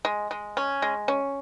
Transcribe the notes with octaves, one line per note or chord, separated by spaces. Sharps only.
G#3
G#3
C#4
G#3
C#4